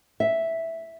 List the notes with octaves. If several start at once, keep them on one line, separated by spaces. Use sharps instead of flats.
E5